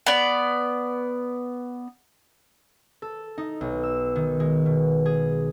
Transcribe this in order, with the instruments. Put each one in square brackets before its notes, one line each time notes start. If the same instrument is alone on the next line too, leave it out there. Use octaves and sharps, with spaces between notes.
[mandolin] B3 D5
[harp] A4
D#4
B1
E6
D#3
G#3
B2
G#4